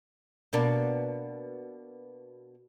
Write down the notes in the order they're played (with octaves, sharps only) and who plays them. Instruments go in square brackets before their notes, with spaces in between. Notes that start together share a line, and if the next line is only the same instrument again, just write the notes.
[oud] B2 A#3 D4